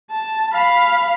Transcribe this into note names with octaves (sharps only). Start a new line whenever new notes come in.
A5
F5 B5